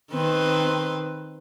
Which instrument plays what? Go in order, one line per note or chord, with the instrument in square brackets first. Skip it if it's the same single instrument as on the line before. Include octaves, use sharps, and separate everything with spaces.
[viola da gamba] D#3 C4 B4